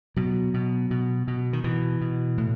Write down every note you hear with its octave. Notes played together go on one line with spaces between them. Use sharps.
B2 F#3
B2
B2
B2
D#3
B2 E3
B2
A2